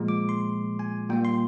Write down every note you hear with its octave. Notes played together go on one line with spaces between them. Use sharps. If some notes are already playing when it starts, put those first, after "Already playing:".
Already playing: A#2 F3 G#3
D6
C6
G#5
A#2 G3 A#3 G5
C6